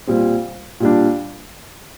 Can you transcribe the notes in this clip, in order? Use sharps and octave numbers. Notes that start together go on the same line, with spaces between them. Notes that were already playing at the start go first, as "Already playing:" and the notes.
A#2 G3 C4
A#2 G3 D4